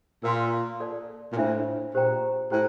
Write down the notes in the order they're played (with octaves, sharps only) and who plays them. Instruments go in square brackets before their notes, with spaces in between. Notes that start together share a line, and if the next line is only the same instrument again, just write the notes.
[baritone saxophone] A#2 [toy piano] A#4 F5 C6
[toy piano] A4 D5 A5
[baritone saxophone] A#2
[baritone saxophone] A2 [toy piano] D4 F4 C5 E5
[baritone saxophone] A#2 [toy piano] G4 C5 G5 A#5
[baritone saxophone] A2 [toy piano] G4 C5 G5 A#5